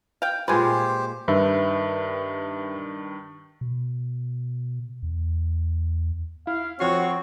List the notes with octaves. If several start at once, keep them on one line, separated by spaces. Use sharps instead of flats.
F5 G5
A#2 G#3 F4 G4 B4 C5 G#5
G2 D#3 B4 E5
B2
E2
E4 F5
F2 F3 C4 F#4 C#5 C7